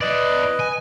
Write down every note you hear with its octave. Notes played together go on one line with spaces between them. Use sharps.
E4 B4 D5 D#5
G#5